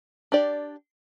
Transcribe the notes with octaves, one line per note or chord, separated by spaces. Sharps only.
D4 G4 D5